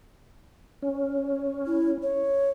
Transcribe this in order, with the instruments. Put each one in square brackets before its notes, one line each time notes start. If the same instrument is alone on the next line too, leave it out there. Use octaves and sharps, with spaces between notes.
[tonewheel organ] C#4
[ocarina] E4
C#5